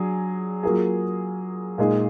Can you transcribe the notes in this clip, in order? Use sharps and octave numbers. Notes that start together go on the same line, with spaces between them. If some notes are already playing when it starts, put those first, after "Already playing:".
Already playing: F#3 D4 G#4
F#3 A#3 F4 G#4
A#2 G#3 D#4 G#4